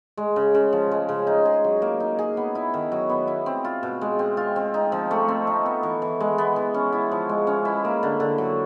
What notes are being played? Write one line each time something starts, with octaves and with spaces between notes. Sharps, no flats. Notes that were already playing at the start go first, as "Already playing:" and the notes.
G#3
C#3
C#3
F3
G#3
C#3
D#4
G#4
F#3
A#3
D#4
G#4
B3
E4
D#3
F#3
B3
E4
C4
F4
B2
G#3
C4
F4
C4
D#4
F3
A3
C4
D#4
B3
E3
E3
G#3
B3
E3
C#4
E4
F3
G#3
C#4
E4
A#3
D3
D3
F#3